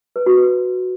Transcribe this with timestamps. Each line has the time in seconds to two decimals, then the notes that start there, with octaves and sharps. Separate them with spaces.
0.16 B4
0.26 F#4
0.37 B4